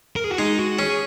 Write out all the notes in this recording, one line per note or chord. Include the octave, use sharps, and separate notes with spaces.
A#4
G#4
F#4
G#3 D#4
F#4
C#4 G#4